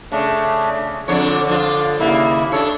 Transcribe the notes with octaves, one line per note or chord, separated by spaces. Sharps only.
C#3 A3 D4
F2 D3 D4 C#5
F3 D4 F4
D#2 C#3 A#3 E4
D4 A4 C#5